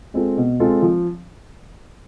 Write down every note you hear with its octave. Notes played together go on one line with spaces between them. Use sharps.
G#3 C4 F4 A4
B2
G#3 C4 F4 A4
F3